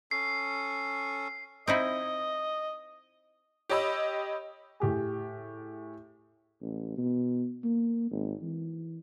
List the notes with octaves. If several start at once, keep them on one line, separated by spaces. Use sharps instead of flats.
C#4 A4 C#6 C7
C4 D#4 E4 D#5
G4 C#5 D#5 B5 E6
A2 G4 G#4
A1
B2
A#3
G#1
E3